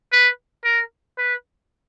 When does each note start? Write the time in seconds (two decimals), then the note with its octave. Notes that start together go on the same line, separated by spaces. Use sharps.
0.13 B4
0.65 A#4
1.18 B4